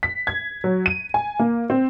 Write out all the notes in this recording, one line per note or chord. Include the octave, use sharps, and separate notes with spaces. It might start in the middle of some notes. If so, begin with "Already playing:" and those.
B6
G#6
F#3
D#7
G#5
A#3
C4